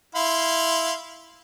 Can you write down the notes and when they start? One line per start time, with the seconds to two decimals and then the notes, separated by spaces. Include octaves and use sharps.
0.15 E4 F5 C6